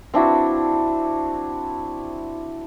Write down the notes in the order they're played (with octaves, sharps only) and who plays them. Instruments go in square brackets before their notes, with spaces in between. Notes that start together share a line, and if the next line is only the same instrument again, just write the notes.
[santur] C4 D4 E4 F#4